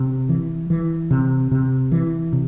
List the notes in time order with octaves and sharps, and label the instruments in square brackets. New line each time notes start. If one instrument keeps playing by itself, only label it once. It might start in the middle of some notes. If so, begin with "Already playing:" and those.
Already playing: [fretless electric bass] C3
E3
E3
C3
C3
E3
C3